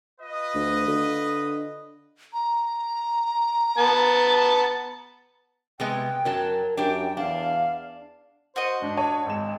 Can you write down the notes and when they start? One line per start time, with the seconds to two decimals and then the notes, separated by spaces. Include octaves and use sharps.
0.21 F4 B4 D#5
0.55 D2
0.88 D3
2.33 A#5
3.78 B3 A5
5.80 C3 G#3 B3 G5
6.25 F#2 F#3 A#4 A5
6.77 F#2 D4 G4 G5
7.17 E2 D4 F5
8.56 F#4 C5 D#5
8.82 G#2 D4
8.97 C#5 A5
9.26 G#1 G#3 E7